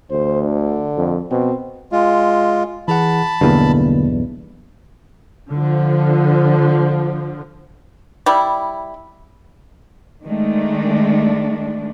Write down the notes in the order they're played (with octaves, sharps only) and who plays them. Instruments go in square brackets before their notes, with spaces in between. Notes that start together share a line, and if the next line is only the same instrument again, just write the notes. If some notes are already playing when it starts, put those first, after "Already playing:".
[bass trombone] D2 [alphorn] C5
[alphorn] D3
[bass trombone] F2
[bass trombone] B2 [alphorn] C4
[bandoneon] G#3 F4
[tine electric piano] E3 G#4 F#5 [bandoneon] A5 B5
[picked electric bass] B1 E2 G2 [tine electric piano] D3 E3 A#3
[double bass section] D3 F3
[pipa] G3 E4
[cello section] D#3 G#3 A3 D4